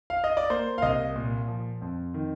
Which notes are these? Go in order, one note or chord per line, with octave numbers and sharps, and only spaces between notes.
F5
D#5
D5
A#3 C5
F5
C2 D#5
A#2
F3
F2
D#3